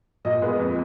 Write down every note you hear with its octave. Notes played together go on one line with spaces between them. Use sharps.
A#2 D#5
G#3 B3
F2